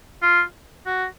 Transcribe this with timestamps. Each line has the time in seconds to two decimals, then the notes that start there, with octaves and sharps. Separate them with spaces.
0.23 F4
0.86 F#4